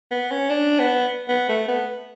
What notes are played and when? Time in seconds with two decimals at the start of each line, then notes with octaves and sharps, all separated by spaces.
0.11 B3
0.31 C#4
0.50 D4
0.79 B3
1.29 B3
1.49 A3
1.68 B3